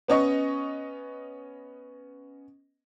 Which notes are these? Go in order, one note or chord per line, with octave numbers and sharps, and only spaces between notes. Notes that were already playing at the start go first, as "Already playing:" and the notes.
B3 C#4 D#5 C#6